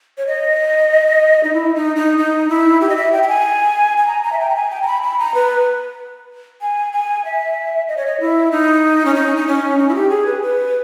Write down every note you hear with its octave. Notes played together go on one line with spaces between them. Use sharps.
C#5
D#5
D#4
E4
D#4
D#4
D#4
E4
G4
D#5
E5
G5
G5
G#5
G#5
A#5
A#5
E5
G5
A#5
G#5
G5
A#5
B5
B5
A#5
B4
G#5
G#5
E5
D#5
C#5
D#5
E4
D#4
C#4
D#4
D#4
C#4
D#4
E4
G4
G#4
B4
B4